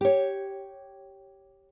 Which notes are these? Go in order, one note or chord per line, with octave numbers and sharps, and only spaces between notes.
G4 C#5